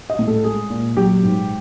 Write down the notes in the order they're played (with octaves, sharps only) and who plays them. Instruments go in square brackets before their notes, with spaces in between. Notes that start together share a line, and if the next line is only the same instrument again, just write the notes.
[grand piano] D#5
A2
A4
G#3 G#4
A#2
F#3 G4
G#2